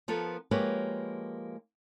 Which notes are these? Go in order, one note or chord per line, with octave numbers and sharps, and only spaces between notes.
F3 B3 F4 A4 A#4
F3 G#3 A#3 G4 B4 C#5